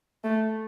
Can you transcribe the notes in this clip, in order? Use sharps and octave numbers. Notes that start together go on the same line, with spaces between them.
A3